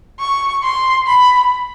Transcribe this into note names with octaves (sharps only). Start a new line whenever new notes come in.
C#6
C6
B5